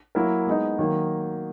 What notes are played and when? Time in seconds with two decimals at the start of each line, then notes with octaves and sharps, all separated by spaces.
0.15 F#3 A#3 E4 A#4
0.47 G#3 B3 D#4
0.79 D#3 F#3 A#3